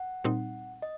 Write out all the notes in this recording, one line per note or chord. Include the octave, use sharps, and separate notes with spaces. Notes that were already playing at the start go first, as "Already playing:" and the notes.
Already playing: F#5
A#2 G3 C4 D#4
D#5